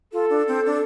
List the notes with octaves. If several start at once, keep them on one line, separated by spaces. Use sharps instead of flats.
F4 A4
D4
C4
D4